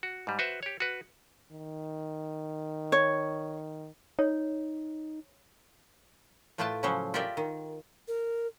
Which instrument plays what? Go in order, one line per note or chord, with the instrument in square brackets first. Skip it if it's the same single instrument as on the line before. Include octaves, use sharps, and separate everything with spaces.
[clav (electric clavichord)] F#4
G#2 G3
F#4 B4 C5 E5
G4 C#5
F#4 B4
[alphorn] D#3
[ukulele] C#5
[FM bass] D#4 [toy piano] C#5
[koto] A2 A3 F4 B4 G5 A5
C#3 F3 F#3 C#4 C5
F4 G4 A#4 D5 E5 G5
D#3
[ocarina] A#4